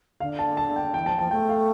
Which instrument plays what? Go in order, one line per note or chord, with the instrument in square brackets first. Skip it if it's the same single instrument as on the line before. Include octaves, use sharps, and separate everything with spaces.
[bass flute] D3 [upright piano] F5
[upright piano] A5
A5
G5
[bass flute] E3 [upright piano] G5
[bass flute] F3 [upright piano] A5
[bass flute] F3 [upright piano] A5
[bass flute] A3 [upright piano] G5
[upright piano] F5